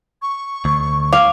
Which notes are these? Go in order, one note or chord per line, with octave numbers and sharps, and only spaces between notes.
C#6
D2
F5 D6